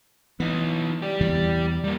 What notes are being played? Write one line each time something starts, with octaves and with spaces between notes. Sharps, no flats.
E3 B3 D#4
G4 D5
E2 C3 E3
G3 A#3